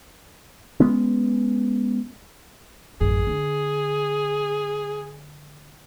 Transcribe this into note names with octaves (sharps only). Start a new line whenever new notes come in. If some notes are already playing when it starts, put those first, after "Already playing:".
G#3 B3 C#4
A1 F#2 G#4
D3